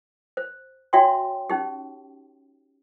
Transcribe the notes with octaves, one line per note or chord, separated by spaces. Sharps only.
C5
D4 F#4 C#5 E5 G5 C6
C#4 D#4 G4